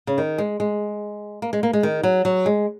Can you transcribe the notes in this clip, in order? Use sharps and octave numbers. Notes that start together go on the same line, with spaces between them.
C#3
D#3
G#3
G#3
A#3
G#3
A#3
G#3
D#3
F#3
F#3
G#3